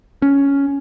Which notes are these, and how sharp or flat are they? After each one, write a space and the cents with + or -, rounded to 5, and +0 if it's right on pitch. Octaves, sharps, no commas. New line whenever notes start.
C#4 +5